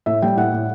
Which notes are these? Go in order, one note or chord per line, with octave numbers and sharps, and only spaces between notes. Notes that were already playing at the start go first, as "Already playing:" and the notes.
A2 E5
G3 G5
A2 F#5
A2